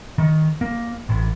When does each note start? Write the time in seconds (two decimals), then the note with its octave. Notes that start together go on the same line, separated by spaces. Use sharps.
0.18 D#3
0.61 A#3
1.09 A1